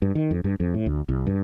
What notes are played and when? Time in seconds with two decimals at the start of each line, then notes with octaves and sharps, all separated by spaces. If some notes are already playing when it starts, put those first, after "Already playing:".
0.02 G2
0.15 D#3
0.31 F2
0.44 G2
0.60 F2
0.74 A2
0.86 D2
1.09 C2
1.27 G2